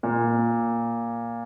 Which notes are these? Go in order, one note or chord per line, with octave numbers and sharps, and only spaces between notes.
A#2